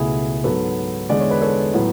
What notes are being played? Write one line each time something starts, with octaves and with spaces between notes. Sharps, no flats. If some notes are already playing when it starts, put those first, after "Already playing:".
Already playing: C#2 B2 A3 E4 G#4
G#2 F#3 B3 F#4 A4
E2 D3 G#3 D5
C#5
B4
A4 C#5
A2 F#3 B3